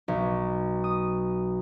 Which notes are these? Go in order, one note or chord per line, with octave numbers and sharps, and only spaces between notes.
B1
D#6